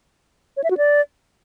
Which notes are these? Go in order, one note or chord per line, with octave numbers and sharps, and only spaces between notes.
C#5
E5
F#4
D5